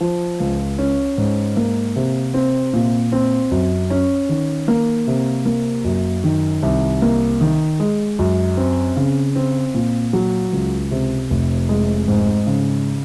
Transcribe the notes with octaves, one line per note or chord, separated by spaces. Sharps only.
F3
C#2
C#4
G#2
A#3
C3
C4
A#2
C4
F#2
C#4
D#3
A#3
C3
A#3
F#2
D#3
C2
A#3
D#3
G#3
F#2
C4
C#3
C4
A#2
F#3
C#2
C3
F1
G#3
G#2
C#3